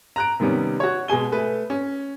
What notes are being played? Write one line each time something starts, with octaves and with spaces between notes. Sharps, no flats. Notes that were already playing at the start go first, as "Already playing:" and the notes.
A#5 F#6 D7
C3 D#3 G3 B3 C#4
F#4 C#5
B2 G#3 G#4 G#5 G7
A3 B4
C#4